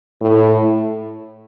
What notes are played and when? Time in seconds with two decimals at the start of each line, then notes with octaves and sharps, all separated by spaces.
0.21 A2